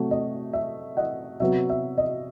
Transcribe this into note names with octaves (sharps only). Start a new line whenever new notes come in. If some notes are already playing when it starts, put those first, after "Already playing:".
Already playing: C3 F#3 A3
D#5
E5
D#5 F#5
C3 F#3 B3 E5
E5
D#5